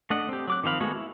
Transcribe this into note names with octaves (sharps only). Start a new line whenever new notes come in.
A3 D4 D#5 F#5
C4 G4
F#3 D6 F#6
D#3 F3 C4 F5 B5
G#3 A3 B3 F#4
E4